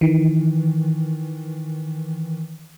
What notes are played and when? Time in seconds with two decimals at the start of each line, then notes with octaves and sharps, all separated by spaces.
0.01 D#3 E3